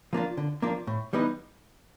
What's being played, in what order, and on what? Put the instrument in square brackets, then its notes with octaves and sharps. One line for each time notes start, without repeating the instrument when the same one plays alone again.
[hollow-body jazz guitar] F3 A#3 D4 F4
D3
F3 A#3 D4 F4
A2
E3 G3 B3 D#4